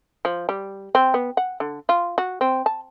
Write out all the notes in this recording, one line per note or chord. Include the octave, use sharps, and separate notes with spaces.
F3
G3
C4
B3
F#5
D3
F4
F#4
C4
A5